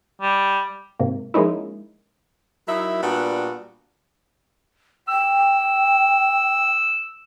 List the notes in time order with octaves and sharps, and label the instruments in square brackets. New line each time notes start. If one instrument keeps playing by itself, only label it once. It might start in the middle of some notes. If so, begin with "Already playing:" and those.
[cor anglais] G3
[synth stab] G#2 C3 A#3
F3 G#3 A#3 C#4 D#4 E4
[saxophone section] F#3 D#4 E4 A#4 E5
A#2 G3 B3 D4 F#4
[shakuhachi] G5 [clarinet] E6